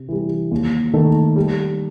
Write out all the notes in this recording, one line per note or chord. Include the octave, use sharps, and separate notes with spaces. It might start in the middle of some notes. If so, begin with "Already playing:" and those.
Already playing: C3
E3 G3
D#2
D#3 A3 D#4 A4
G3